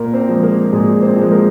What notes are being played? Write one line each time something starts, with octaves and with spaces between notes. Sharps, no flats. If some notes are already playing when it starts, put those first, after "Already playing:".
Already playing: A#2 A#3 A#4
C4 C5
F3 G#3
A#3 A#4
A#2 G#3 G#4
C4 C5
F3
G#3
A#3 A#4